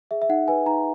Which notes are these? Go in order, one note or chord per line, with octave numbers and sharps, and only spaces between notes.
G#4 E5
E5
D#4 F#5
B4 G#5
D#4 A#5